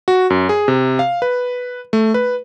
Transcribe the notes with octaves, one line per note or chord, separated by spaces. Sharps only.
F#4
F#2
G#4
C3
F5
B4
A3
B4